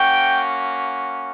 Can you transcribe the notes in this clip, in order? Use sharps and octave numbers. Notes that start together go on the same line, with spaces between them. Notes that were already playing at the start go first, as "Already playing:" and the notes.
Already playing: A#3 C#4 F#4 G5